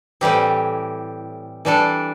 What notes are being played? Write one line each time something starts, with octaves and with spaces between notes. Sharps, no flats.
A2 E3 G3 C4 G4
E3 G3 D4 A4